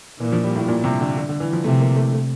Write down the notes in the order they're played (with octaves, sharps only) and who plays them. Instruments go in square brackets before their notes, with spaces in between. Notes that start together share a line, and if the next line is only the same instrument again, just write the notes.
[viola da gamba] A#2 [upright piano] E3
[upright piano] F3
G3
A2
A#2
C3
D3
D3
D3
E3
F3
[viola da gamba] C3 [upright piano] A3
[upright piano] A#3
A3
A3